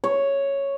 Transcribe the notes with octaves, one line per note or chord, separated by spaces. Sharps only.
C#5